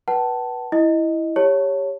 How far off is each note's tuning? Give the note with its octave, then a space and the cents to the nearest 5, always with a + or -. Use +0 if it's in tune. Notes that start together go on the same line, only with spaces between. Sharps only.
B4 -15 F#5 +45 A5 +0
E4 +0 D#5 +0
G4 +20 C#5 +0 A5 +20